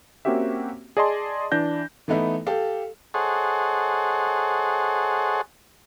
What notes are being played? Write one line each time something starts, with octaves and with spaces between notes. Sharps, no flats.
A#3 C4 C#4 F#4 G4 E5
G#4 D5 D#5 A5 C6
E3 D4 G6 A#6
E3 A3 B3 D#4 E4
G4 A4 F5
G#4 A4 C5 C#5 D#5 F#5